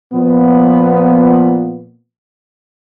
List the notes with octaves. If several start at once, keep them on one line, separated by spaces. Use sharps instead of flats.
A#2 F3 B3